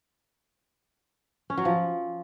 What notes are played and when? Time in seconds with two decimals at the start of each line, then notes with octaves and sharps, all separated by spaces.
1.50 C#4
1.57 F#3
1.65 F3